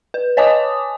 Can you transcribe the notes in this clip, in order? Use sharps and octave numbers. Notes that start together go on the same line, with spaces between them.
B4
C#5 D#5 G#5 A5 D6 D#6